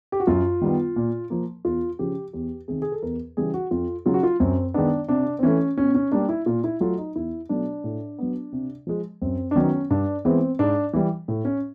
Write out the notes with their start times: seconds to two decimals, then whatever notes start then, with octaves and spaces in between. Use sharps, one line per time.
0.12 G4
0.20 F#4
0.27 F#2 F4
0.61 D#3 G3 B3
0.96 A#2
1.30 F3 A#3
1.65 E2 F4
1.99 C#3 F3 G4
2.33 E2 G4
2.68 C3 D#3 G#4
2.82 G#4
2.92 A4
3.03 E2 A#4
3.37 C#3 E3 G3 G#4
3.54 F#4
3.71 F2 F4
4.06 C#3 F#3 F4
4.14 F#4
4.23 F4
4.40 F#2 C4
4.74 D#3 G#3 B3 D4
5.08 C3 D4
5.39 C4
5.43 E3 A3 C#4
5.77 B2 C#4
5.95 C#4
6.12 G3 A#3 D4
6.29 E4
6.46 A#2 F4
6.64 E4
6.81 F#3 A3 F4
6.98 D#4
7.15 E2 E4
7.49 B2 F#3 A3 D4
7.84 A2
8.18 F#3 B3
8.52 C3
8.87 F3 G#3
9.22 F#2 C4
9.51 D4
9.56 D#3 F#3 B3 C#4
9.90 G2 D4
10.25 E3 G#3 B3 C4
10.59 G#2 D4
10.93 E3 G3
11.28 A2
11.45 C#4